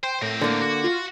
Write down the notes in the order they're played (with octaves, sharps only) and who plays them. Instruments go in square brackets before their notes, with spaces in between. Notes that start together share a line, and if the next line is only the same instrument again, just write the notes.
[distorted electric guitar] C5 [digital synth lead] G5
[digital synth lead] A2 [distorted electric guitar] C4 A#4
[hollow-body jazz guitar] D3 A#3
[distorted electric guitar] F#4
[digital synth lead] F4